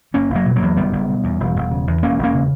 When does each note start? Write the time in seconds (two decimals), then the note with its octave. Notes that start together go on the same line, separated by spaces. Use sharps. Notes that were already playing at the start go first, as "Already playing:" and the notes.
0.14 F#1 A#3 C#4
0.30 F#1
0.35 F#3 A#3
0.46 B2
0.56 F#3 A#3
0.62 E2
0.76 F#1 G3 B3
0.92 F#1
1.09 B2
1.24 E2
1.40 E1
1.55 E1
1.71 C#3
1.87 E2
2.03 E1 A#3 C#4
2.18 E1
2.24 A#3 C#4
2.34 C#3